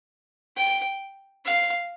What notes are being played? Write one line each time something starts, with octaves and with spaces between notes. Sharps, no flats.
G5
F5